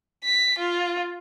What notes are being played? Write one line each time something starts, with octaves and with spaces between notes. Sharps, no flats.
B6
F4